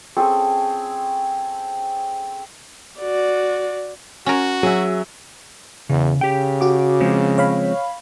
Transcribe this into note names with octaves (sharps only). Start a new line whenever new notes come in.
C4 C#4 G#4 A4
F#4 D5
C#4 F#4 A#4
F#3 G#4 E5
E2 C#3
C#3 G4 G5
F#4 D6
F3 G#3 C4
C#5 F5 B5